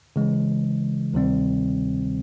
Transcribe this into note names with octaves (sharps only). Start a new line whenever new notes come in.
C#3 E3 G#3
D2 C3 D#3 G3 C4